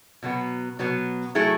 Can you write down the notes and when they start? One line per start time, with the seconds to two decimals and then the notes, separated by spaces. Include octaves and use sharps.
0.23 B2 F#3 B3
0.79 B2 F#3 B3
1.35 F#3 A3 E4 G#4